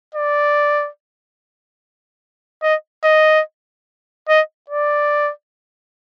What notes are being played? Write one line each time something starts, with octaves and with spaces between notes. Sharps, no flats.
D5
D#5
D#5
D#5
D5